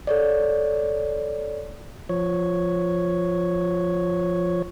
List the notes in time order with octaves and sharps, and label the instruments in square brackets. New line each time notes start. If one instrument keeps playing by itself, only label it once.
[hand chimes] A4 C#5 D5
[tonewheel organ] F3 C#5